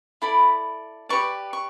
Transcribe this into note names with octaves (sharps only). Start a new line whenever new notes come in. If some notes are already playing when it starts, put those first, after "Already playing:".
E4 A4 D5 B5
G4 B4 D5 C#6
C#6